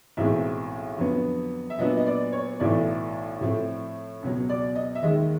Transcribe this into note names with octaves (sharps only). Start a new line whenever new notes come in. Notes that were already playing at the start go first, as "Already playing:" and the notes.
B1 A2 E3 G#3 C4 E5
F2 D3 F#3 B3
E5
A#2 F#3 B3 D4 D#5
D#5
D5
C#5
B1 A2 E3 A3 D5
A2 F3 A3 C4
C#2 B2 F#3
D5
D#5
E5
D#2 D#3 G#3 D#5